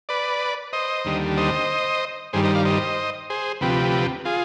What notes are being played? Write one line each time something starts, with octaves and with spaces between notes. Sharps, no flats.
B4 D5
C5 D#5
D#2 D3 G3
C5 D#5
G2 D#3 G3 G#4 C5
C5 D#5
D5 F5
C5 D#5
G#4 C5
D2 C3 F3 G4 B4
F4 G#4